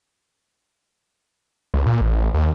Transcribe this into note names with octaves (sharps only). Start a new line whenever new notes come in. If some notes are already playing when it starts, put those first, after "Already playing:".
C#2
A#2
A1
A1
D#2